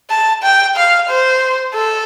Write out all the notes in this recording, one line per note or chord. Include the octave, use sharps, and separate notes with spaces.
A5
G5
F5
C5
A4